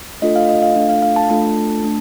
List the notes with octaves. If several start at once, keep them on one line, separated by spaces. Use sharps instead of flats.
A3 D4 F4 A4 D#5
F5
D#5
F5
A3 D4 F4 A4
F5
F5
A5
A3 D4 F4 A4 A5
A3 D4